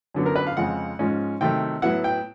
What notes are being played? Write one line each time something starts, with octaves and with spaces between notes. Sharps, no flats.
F#2 D3 F#3 B3
A#4
B4
F5
F2 C#3 F3 G#3 F#5
G#2 F3 G#3 C#4
C3 D#3 F#3 A3 G5
A2 F#3 B3 E4 F#5
G5